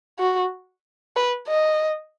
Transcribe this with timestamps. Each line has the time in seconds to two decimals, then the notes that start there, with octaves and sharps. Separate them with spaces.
0.19 F#4
1.16 B4
1.48 D#5